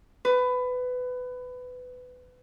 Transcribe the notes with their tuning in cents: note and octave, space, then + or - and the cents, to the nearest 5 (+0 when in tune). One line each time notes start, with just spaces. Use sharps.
B4 +20